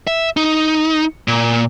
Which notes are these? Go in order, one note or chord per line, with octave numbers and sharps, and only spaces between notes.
E5
D#4
A#2